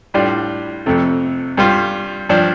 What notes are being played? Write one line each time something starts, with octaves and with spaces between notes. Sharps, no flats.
A2 G3 D4 F4
F2 C3 A3
G2 G3 F4
G2 F3 D4